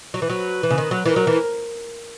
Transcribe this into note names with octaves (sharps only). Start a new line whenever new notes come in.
F#3
E3 B4
F#3
E3
C#3
D#3
F#3
E3 A#4
F#3
E3